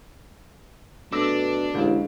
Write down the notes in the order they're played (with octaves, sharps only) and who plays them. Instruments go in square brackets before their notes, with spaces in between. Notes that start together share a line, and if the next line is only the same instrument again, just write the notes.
[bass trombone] B2 [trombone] A3 [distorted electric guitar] D4 [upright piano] D6 E6 A#6
[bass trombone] A1 [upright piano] D2 F5 [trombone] G#3